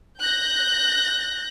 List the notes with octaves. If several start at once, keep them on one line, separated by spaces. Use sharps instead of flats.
F#6 G6 A#6